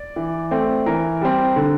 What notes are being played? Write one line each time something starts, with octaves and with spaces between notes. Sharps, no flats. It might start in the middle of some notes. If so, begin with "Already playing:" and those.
Already playing: D5
E3
A3 C4
E3 A#4
G3 C4
D3